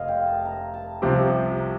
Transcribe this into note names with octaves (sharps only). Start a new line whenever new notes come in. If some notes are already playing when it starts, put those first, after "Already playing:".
Already playing: F1 C5 D#5 F5
G5
A5
A#5
A5
C2 C3 F3 C4 G4
A#5